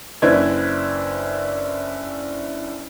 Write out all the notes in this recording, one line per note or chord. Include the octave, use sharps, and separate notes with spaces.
F#1 D4 E4 B4 C5 G#6